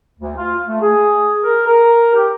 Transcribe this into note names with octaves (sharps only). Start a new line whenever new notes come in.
D2
F4
A3
G#4
A#4
A#4
G4